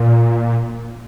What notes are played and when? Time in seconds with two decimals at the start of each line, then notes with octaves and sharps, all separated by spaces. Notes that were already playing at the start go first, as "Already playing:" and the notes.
Already playing: A#2